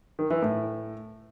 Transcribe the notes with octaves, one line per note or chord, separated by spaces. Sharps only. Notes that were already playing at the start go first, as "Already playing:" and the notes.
D#3
E3
A2